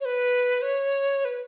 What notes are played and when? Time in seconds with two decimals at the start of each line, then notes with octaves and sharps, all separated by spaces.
0.01 C#5
0.05 B4
0.62 C#5
1.25 B4